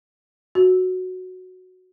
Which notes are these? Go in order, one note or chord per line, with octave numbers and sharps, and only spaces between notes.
F#4